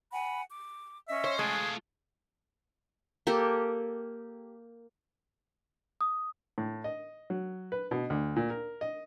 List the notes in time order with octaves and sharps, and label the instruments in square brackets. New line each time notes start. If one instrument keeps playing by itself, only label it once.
[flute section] F#5 G#5 B5
D6
[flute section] C#4 D#5 [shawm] E5
[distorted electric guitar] C5 [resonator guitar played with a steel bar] C#5
[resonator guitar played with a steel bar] G#3 [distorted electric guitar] A3 F4 [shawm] G#4
[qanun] A#3 G4 A4
[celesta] D#6
[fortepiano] A2
D#5
F#3
B4
B2
D2
A#2
A#4
D#5